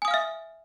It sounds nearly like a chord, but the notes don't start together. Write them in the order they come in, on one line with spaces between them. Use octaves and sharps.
G#5 D#6 F5 F6 E5